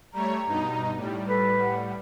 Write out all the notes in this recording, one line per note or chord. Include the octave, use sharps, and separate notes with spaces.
G3 A3 C#5 A#5
G2 B2 D#4
A2 G3
A4 B4
F#5